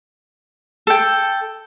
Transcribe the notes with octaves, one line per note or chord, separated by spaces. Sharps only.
A4 G5